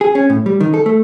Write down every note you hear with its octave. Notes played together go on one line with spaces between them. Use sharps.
G#4
C#4
A2
G3
D#3
A4
A3